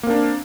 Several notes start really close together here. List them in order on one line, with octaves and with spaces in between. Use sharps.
A#3 C4 D4